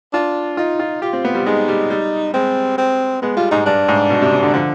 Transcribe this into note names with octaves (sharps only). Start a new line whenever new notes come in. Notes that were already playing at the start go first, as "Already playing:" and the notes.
D4 F4
D#4 F4
F4
F4 G4
C4
B3
G3
G#3 D#4
G3
G3
G#3 C4
C4
G#3 B3
G3 F4
G#2 D#4
G2 D4
G#2
B2
C3
C3
D3
D3 F3